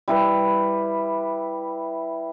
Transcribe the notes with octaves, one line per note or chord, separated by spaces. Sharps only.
G3 E4 B4